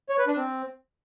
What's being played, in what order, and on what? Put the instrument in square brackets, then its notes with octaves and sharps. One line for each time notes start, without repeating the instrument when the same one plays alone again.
[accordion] C#5
B4
D4
C4